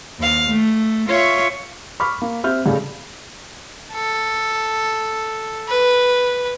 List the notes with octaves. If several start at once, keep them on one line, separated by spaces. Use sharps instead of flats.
D#2 F5
A3
F4 C#5 E5 C#6
B5 C#6 D6 F6 B6
A#3
C4 G4 E5 F6 G6
G2 C#3 G3 A3 C#4
A4
B4